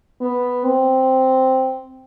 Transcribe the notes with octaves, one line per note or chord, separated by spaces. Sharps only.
B3
C4